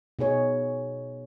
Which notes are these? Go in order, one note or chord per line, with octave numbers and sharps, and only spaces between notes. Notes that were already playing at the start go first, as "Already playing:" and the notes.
B2 D#4 G#4 C#5